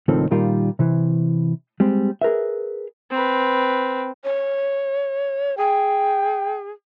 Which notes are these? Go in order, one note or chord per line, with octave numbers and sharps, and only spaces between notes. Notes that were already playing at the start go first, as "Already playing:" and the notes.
C#2 A2 D#3 F3 C4 A4
A#2 D#3 G3 F4 A#4 F5
C3 E3
G3 G#3 C4
G#4 A#4 B4 E5
C4 B4
C#5
G#4 G5